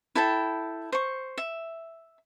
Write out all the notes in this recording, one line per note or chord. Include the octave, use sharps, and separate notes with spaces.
E4 A4 G5 A5
C5 C#6
E5